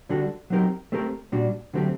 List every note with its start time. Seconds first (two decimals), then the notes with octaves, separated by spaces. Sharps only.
0.09 D3 G3 D4 F#4 A4
0.50 F#3 C4 D#4 G4 A#4
0.92 A3 C4 G4 A#4
1.32 A#2 G3 D4 F#4
1.74 D3 F#3 A3 C4 G4